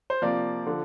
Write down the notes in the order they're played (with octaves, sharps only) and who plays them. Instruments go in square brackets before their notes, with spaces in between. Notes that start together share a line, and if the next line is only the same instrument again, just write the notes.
[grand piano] C5
C3 F3 A#3 D5
D3 F3